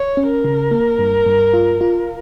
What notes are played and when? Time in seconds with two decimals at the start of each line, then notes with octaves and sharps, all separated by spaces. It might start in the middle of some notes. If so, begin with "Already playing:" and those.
Already playing: C#5
0.17 C#4
0.31 A#4
0.44 C#3
0.71 A#3
0.99 G2
1.26 G2
1.53 F4
1.81 F4